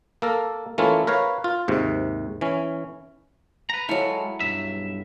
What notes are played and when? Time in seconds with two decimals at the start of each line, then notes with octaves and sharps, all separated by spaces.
0.22 A#3 A4 A#4
0.78 E3 A3 A#3 C#4 E4 F4
1.07 A#4 B4 C#5 F5
1.44 F4
1.68 D#2 G#2 C3
2.41 E3 C#4
3.70 B4 A#5
3.89 F#3 G#3 E4 F4 A4
4.40 B1 G2 E5